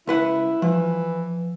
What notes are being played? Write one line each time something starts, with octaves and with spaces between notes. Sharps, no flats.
C#2 E4 B4 F#5
E3 F3